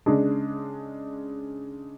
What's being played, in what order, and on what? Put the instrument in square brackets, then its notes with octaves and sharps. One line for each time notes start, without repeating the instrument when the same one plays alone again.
[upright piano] C#3 G#3 D4